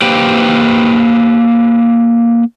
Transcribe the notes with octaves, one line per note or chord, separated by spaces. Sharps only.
A#3 G4 B4 C5 G5